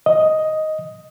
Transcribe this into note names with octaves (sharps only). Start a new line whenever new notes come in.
D#5